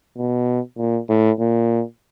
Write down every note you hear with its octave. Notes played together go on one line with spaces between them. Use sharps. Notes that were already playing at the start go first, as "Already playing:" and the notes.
B2
A#2
A2
A#2